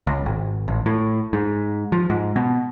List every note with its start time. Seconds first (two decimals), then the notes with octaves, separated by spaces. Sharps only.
0.07 C#2
0.26 G#1
0.68 A1
0.86 A2
1.33 G#2
1.92 F3
2.10 G#2
2.36 B2